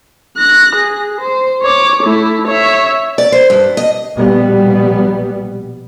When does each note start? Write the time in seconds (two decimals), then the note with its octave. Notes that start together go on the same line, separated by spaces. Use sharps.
0.38 F#6 A#6
0.76 G#4
1.21 C5
1.62 C#5 D6
2.03 A3 E4
2.48 C#5 E5
3.18 D5
3.32 C5
3.50 G2
3.77 D#5
4.16 A#1 B2 G3 B3